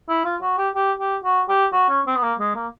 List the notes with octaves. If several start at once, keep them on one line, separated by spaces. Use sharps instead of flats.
E4
F4
F#4
G4
G4
G4
F#4
G4
F#4
C#4
C4
B3
A#3
G#3
A#3